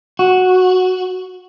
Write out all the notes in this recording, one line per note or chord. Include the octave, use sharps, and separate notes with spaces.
F#4